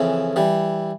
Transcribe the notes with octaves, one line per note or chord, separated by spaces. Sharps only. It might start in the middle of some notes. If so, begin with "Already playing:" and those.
Already playing: F2 C#3 E3
E3 G3